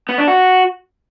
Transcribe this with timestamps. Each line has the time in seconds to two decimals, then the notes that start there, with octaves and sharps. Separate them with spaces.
0.09 B3
0.18 D4
0.28 F#4